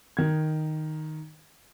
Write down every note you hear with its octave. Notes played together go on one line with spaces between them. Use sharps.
D#3 G#6